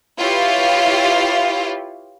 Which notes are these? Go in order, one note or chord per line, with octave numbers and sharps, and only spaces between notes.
E4 F4 G4 B4 C#5 F5